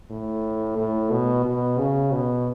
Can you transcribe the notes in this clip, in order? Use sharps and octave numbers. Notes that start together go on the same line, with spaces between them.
A2
A2
B2
B2
C#3
B2